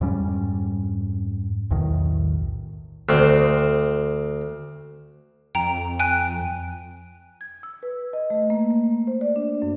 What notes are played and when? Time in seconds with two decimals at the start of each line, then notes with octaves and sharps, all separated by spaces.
0.01 F2 G#2 G3 C#4
1.71 B1 E2 A2 D#3
3.09 D2 C4
5.55 F2 G5 A#5
5.99 G5 G#5 F#6
7.41 G#6
7.63 E6
7.83 B4
8.13 D#5
8.30 A3
8.50 A#3
8.71 A#3
9.07 C5
9.21 D5
9.36 D4
9.62 F#2